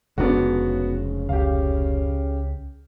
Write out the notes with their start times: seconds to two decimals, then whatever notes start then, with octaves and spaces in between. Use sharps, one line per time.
0.18 F1 G#2 C#3 B3 D4 F#4
1.29 C#2 G4 F5